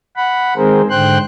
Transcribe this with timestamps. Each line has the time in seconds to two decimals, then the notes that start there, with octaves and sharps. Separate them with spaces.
0.17 F#5 B5
0.56 D#3 G#3 C4 G#4 A#4 C5
0.90 G#2 D3 C5 G5 C6 F#6